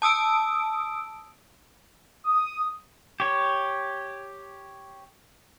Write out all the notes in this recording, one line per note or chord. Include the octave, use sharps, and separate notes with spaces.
A5 D#6 E6 D7
D#6
G4 C#5